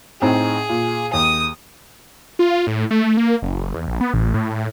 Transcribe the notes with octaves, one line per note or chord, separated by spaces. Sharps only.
A2 C4 D#4 G#4
A#2
D#2 D#6
F4
A2
A3
A#3
F#1
E2
A#1
B3
A1
A2